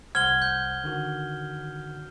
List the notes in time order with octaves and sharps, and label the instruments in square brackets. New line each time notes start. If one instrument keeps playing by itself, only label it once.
[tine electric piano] C2 C5 F#5 [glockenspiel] F6 G7 [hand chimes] G#6
[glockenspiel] G6
[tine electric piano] D3 D#3 F#4